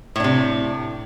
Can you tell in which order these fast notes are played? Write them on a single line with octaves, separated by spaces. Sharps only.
A2 D4 C3